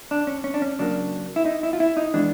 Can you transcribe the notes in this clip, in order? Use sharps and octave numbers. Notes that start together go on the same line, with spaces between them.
D4
C#4
C#4
D4
C#4
C#3 F#3 A#3 D4
E4
D#4
E4
F4
E4
D#4
E3 G#3 B3 D4